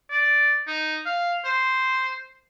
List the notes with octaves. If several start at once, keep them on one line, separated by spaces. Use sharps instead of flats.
D5
D#4
F5
C5